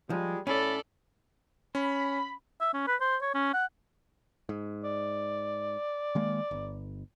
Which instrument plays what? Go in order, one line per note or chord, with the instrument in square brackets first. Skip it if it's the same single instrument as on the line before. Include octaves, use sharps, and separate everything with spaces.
[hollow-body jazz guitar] F3 [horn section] G3 G#3
[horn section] A2 B5 [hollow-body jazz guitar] C#4 [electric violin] A4 D5
[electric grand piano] C#4 [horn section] B5
[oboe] E5
C#4
B4
C5
C#5
C#4
F#5
[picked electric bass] G#2
[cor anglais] D5
[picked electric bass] D#3 G#3 A#3
G1